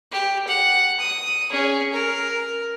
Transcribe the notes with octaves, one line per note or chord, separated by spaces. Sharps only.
G4
F#5
D#6
C#4 G#4
A#4